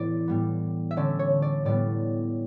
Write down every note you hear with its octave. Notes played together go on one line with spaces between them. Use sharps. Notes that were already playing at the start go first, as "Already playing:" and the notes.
Already playing: A2 E3 B3 D5
A2 G3 B3
E5
D3 A3 C#4 D5
C#5
D5
A2 G3 B3 D5